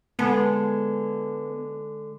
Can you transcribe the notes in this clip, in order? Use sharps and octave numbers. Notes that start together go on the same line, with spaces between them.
D3 G#3 B3 A4